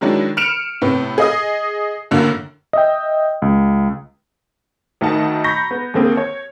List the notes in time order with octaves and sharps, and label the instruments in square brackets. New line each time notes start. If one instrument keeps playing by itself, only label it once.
[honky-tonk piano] D#3 F#3 G#3 D4 E4
F6 C#7 D7 E7 F7
A2 C3 B3
G#4 D#5 D#6
F#2 A2 D3 A#3
[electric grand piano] D#5 E5 G5
C#2
[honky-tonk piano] D2 D#3 D#4 D#5 F#5 A5
A#5 B5 C#6 G6 A#6
B3
D#2 D3 A#3 C4 G#4
C#5